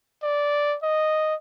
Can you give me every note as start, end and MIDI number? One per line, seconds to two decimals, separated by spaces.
0.23 0.77 74
0.83 1.35 75